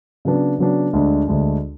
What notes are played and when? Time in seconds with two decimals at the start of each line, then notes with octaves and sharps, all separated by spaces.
0.25 C#3 F#3 B3 D4
0.59 C#3 F#3 B3 D4
0.93 D2 D3 G#3 D4
1.28 D2 D3 G#3 D4